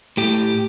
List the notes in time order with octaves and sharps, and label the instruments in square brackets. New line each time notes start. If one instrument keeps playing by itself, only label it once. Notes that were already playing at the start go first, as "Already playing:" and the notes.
[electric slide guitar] A2 G4